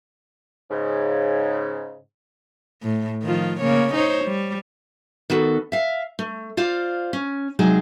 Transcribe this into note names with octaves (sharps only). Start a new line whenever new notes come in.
G#2 C#3
A2
D#3 F3 F4
C#3 A#3 C#5
D#4 C5 C#5
G3
D#3 B3 F#4 A4
E5 F5
A3
F4 C5 D5 F5
C#4
C3 F#3 G#3 D#4 G#4